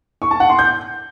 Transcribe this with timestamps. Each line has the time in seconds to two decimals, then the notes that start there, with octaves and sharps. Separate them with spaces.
0.22 C#6
0.31 A5
0.40 F#5
0.49 C6
0.59 G6